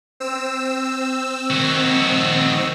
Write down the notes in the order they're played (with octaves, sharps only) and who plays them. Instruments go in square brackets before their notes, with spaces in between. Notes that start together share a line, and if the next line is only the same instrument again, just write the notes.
[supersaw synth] C4 E6
[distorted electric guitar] D#3 F#4